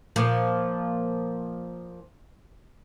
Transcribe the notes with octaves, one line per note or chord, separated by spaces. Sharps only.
A#2 F3